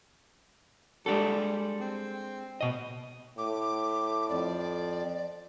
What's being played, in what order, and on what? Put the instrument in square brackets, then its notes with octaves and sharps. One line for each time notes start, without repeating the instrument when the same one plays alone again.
[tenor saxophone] G3 [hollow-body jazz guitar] G#3 D4 A4
[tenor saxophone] C4
[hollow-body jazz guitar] B2 D#5
[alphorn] A2 [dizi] D6
[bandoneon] F2 [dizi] D5